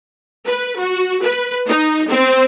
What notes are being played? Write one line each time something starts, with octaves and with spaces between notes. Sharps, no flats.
B4
F#4
B4
D#4
C4